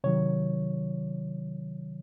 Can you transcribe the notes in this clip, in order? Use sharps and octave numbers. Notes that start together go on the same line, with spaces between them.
C3 D#3 F#3 C#5